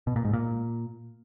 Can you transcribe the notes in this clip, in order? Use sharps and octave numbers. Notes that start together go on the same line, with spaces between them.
B2
A#2
G#2
A#2